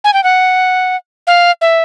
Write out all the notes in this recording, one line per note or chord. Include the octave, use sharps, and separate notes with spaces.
G#5
G5
F#5
F5
E5